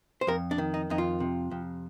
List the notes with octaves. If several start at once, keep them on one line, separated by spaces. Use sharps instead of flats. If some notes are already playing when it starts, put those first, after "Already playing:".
C5
F2 A#4
D4
D#3
D#4
F2 D#4
F4
C3
F2